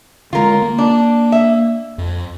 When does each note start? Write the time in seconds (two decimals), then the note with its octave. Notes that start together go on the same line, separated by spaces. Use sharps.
0.33 D3 G#3 F4 A#4
0.62 A#3
0.78 D4
1.32 E5
1.98 F2